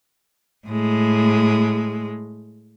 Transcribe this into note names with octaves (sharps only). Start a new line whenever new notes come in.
A2 G#3